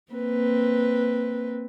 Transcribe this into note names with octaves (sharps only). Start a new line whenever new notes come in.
A#3 C4 B4